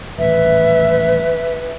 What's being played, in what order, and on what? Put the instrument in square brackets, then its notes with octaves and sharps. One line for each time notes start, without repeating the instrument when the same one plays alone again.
[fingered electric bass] D#1 A1 [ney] B4 [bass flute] E5